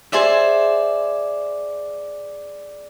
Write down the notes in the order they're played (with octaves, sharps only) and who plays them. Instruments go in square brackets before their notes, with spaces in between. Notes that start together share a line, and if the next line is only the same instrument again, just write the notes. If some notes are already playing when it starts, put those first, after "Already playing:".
[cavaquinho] G#4 C5 D5 E5